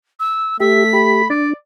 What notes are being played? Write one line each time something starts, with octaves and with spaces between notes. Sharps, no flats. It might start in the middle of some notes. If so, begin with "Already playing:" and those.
E6
A3 G4 E5 B6
G4 B5
D4 D5